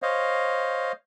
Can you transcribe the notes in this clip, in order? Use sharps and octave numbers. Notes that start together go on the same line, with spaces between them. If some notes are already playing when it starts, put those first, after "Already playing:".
C5 C#5 D#5 F5